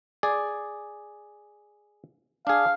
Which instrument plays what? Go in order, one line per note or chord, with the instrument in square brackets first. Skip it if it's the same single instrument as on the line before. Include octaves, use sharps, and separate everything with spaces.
[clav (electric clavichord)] G#4 D5
[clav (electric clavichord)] D4 G#4 [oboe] F5